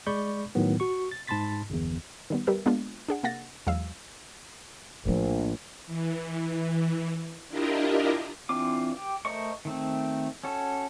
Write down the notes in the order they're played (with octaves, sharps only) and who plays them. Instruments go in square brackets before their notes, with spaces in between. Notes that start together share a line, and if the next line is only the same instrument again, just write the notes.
[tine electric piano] G#3 D5 B5 C#6 G6
A2 D#3 F#3 B3
F#4 C#6
A6
G#2 A5 B5 C6 A6 B6
G1 E2
[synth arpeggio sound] D#3 G3 B3
G3 G4 A#4 B4 E5
G#3 A#3 B3 D4 F4
D4 G#4 F#5
C3 A#3 F#5 A6 A#6
E2 F#3 G#3 F5 E6
[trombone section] A#1 [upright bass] A2 F3
[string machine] E3
D4 E4 F4 G4 A#4 D#5
[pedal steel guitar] E3 C4 D4 F4 D6
G4
A3 A#4 C5 D#5 C#6
D#3 A3 C4
C#4 F#4 A4